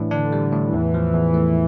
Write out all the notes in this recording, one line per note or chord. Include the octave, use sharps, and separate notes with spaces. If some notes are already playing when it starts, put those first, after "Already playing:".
Already playing: A2 E3 D4
D3 D4
G3
A2
E2 E3
F3
E2
A3